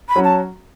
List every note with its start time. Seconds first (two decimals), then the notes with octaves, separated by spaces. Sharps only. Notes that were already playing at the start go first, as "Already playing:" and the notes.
0.09 B5
0.16 F#3 C#4 F#4
0.24 A5